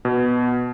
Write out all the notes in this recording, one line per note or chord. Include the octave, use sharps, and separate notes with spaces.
B2